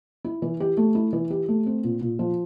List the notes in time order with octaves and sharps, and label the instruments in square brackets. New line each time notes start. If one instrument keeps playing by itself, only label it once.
[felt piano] E4
E3
G4
A3
E4
E3
G4
A3
C4
A#2
A#2
F3